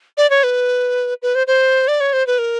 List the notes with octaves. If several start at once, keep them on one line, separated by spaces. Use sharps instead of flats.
D5
C#5
B4
B4
C5
C5
D5
C#5
C5
B4
A#4